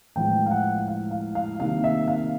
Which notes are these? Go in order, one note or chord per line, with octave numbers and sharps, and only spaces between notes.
A2 F3 G#3 B3 G5
F5
F#5
F5
F5
F5
C3 D#3 G3 A#3 F5
E5
F5